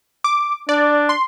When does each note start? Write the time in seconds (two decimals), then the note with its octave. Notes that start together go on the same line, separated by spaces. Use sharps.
0.24 D6
0.69 D4 D5
1.09 C6